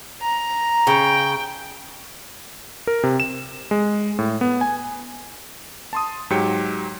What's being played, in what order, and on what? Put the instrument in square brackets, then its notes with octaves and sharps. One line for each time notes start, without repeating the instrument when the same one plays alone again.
[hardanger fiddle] A#5
[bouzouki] C#3 [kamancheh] G5
[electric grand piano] A#4
C3
E7
G#3
A2
B3
G#5
A5 C6 D#6
G#2 F#3 G4 G5 C#7